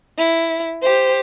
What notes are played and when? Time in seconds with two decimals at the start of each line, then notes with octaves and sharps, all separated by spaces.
0.18 E4
0.82 G4 C5